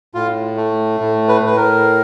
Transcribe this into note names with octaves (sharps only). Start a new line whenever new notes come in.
A2 F4
A3
A2
B4
A2 B4
A#4